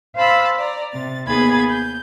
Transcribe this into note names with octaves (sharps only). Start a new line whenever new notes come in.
C5 F5 A5 B5 E6
D5 A#5
C3 A6
D#2 B3 G#4 B5 G#6 A6
G6